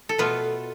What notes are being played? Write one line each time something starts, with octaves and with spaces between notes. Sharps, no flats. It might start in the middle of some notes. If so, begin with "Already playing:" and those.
A4
B2 A3 B3 F4 B4